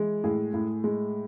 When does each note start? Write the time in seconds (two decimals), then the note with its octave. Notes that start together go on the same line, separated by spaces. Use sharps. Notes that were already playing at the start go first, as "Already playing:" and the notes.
Already playing: E3 G#3
0.24 A2 G#4
0.54 A2
0.84 G#3